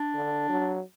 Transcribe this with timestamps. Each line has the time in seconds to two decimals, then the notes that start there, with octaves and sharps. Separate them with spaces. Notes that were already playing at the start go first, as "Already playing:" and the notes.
Already playing: D4
0.15 D3
0.50 F#3